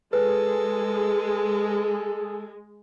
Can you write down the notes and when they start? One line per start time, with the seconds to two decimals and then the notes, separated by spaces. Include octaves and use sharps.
0.13 G#3 G#4 A4 B4